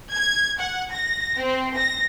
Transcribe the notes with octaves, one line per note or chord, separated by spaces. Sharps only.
G#6
F#5
A#6
C4
A#6